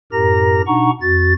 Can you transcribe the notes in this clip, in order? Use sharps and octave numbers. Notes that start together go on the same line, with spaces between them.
F#2 A2 G4 A#4 A#5 A#6
B2 D4 D#4 F#5 A#5 C#6
F2 F#4 A6